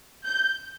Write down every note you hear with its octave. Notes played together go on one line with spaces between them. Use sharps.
G6